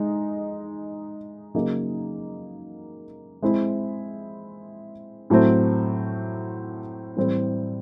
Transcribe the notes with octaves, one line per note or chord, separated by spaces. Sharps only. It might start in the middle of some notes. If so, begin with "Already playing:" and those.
Already playing: G#3 D#4
C#3 F#3 A#3 D#4 G#4
G#3 C4 E4
A2 F#3 A3 C4
A2 E3 G3 C4 E4